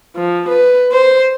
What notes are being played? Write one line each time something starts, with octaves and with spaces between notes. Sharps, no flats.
F3
B4
C5